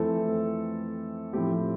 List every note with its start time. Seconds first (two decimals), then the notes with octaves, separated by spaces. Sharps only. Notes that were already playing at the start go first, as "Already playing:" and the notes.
Already playing: F2 E3 A3 C4 A4
1.33 A2 F3 A3 C4 G4